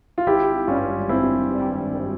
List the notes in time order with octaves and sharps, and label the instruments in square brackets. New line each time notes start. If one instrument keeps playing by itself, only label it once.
[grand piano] F4
[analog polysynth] G#1 [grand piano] E4 G4
[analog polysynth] G2 G3 [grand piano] C#4 F4
[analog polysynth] G#1 [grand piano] C4 E4
[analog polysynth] G2
G3
G#1